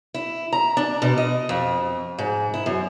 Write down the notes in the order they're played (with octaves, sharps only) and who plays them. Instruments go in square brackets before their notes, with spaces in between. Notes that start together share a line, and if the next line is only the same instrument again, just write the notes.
[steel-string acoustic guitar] E4
A#5
D4
B2
D#5
F2
G#2
E4
F#2